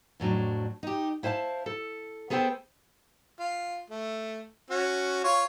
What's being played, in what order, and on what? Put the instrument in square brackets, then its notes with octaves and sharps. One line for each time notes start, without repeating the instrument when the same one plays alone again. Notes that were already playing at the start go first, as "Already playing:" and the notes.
[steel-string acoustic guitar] F2 A2 F#3 D4
D#4 G4
E4 C5 F5 G#5 A5
A4
B3 G#4 A4 C5 G5
[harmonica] F4
A3
C#4 F#4
F4 C#5